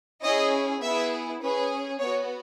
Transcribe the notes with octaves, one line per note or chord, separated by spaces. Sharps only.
C#4 E4 G#4 D#5
B3 E4 G#4 E5
C#4 G#4 B4
B3 F#4 C#5